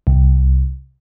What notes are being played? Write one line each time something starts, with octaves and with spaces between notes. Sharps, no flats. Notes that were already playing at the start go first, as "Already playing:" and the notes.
C2